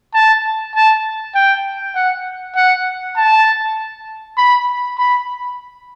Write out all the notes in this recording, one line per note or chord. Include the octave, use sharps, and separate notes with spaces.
A5
A5
G5
F#5
F#5
A5
B5
B5